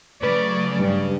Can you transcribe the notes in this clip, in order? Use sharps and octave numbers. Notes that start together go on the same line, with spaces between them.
C#3 F#3 A3 B4 D5
G2